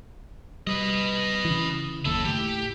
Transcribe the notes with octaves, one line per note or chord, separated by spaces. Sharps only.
G3 B4 D#5
C#3 E3
F#1 D#2 E4 A4
A2 G4